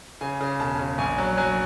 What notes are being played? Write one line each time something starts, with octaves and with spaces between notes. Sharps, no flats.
C#3 G#5
C#3
E1 A5
C#3
A#1 G#5
F#3
F#3 G#5